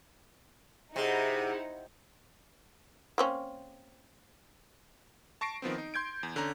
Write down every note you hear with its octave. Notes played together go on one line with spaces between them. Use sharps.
C3 D#4 E4 G#4 F#5
A#3 C4 C#4
A5 C#6 A#6 C7 D7
D#3 F3 B3 C4
D#4
C6 G6 G#6 D7
E2
D3 C#4 A#5